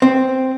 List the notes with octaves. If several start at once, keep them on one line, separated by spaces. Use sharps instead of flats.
C4